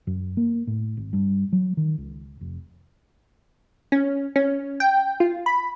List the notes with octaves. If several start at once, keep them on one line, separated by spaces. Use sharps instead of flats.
F#2
A#3
A2
G#1
G2
F#3
D#3
C#2
F1
C#4
C#4
G5
F4
B5